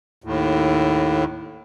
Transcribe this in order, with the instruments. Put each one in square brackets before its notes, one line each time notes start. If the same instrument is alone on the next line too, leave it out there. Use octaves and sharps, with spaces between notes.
[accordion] D#2 A2